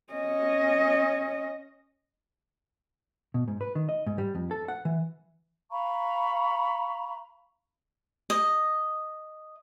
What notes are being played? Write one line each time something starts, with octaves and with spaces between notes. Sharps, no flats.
C#4 D#5
B2
G#2
B4
D#3
D#5
G#2
G3
F2
A4
F#5
E3
F5 A#5 B5 C#6
D#5